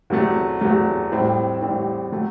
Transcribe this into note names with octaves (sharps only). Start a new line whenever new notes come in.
E2 C3 F#3 A3
E2 C3 F#3 A3
A1 A2 G3 C4
A1 A2 G3 C4
F#3 A3